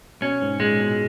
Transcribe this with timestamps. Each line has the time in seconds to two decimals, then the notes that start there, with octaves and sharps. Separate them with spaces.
0.22 B2 C#4
0.42 G#2
0.60 A#2 G#3
0.79 B2